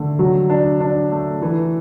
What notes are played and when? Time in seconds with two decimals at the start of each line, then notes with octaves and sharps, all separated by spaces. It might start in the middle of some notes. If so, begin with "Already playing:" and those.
Already playing: D3 A3
0.19 F#3
0.50 D4
0.80 D4
1.12 A3
1.42 E3